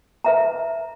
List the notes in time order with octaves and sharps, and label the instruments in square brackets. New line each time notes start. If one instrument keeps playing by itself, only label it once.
[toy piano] B4 E5 A#5